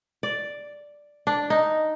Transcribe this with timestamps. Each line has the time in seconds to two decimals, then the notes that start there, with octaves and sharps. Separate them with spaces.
0.23 D5
1.27 D4
1.50 D#4